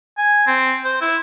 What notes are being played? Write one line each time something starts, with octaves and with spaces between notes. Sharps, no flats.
G#5
C4
C5
E4